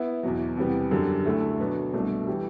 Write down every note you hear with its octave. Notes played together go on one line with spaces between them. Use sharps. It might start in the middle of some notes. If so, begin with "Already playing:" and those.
Already playing: B3 E4
E2 B2 F#3
E2 C3 G3 B3
F#2 D3 G3
D2 D3 A3 E4
B2 F#3 B3 D4
C2 B2 A3 D4
E3 G3